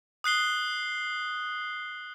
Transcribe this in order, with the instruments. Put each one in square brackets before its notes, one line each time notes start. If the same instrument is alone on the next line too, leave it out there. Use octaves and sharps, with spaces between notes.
[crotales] D#6 F#6 C7 G7